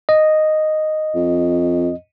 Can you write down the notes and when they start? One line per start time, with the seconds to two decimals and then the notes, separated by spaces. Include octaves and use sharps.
0.09 D#5
1.15 F2